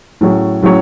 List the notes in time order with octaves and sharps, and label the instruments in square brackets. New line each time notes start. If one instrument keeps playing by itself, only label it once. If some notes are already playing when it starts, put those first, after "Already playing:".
[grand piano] A2 F#3 C#4 G#4 C#5
A2 F#3 C#4 G#4 C#5